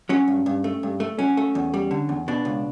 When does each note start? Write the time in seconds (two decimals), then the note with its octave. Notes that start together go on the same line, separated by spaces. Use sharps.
0.09 F#3 C#4
0.28 G2
0.46 G2
0.64 A3
0.83 G2
1.00 A3
1.19 F#3 C#4
1.37 A3
1.55 E2
1.74 G3
1.91 D3
2.09 E2
2.28 B2 D4
2.45 C#2